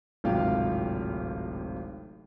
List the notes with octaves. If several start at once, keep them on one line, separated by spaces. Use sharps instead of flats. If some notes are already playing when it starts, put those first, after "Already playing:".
D1 G#1 C3 F4 F5 G5